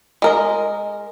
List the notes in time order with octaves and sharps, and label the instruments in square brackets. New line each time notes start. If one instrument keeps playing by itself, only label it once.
[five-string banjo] G#3 A#4 D#5